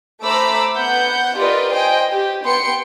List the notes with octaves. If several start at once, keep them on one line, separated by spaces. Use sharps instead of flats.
A3 C5 A#5 B5 D6 E6
B3 F#5 G6
F4 G4 A#4 B4 D5 D#5
C5 D#5 G5 G#5
G4
B3 G5 C6 C#7